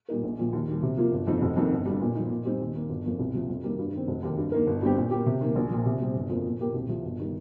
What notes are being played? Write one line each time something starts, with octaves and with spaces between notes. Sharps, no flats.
A#2 G3 D#4 A#4
A#1
A#2 F3
D#2
D#3 G3
C3
F3 A#3 F4
G1
F2 F3 D#4
F1
F2 D#3 A#3 D#4
G1
G2 G3
A#2
F3 D#4
A#2
G3 C4 D#4
D#2
D#3 A#3
G1
F2 F3 A#3
C2
C3 F3
F2
D#3 G3 A#3
G2
D#3 C4
F1
D#2 D#3 A#3 G4
G2
D#3 A#3 D#4 A#4
G1
G2 G3 C4 G4
A#2
A#3 G4
C3
D#3 A#3
A#1
A#2 F3
C3
G3 C4
G1
F2 F3 A#3
A#2
A#3 G4 A#4
C2
C3 F3
G1
D#3 G3